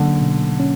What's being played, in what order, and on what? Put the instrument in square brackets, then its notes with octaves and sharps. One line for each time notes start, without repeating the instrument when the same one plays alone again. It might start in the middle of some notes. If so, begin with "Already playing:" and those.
Already playing: [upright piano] D3 [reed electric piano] F#3 A#3 C#4
[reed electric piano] B2
C#4